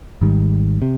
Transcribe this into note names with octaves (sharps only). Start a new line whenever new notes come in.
G#1 G#2 D#3 G3
C3